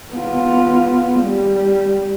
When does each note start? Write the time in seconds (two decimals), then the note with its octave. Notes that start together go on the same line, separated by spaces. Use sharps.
0.14 B3 F4
1.20 G3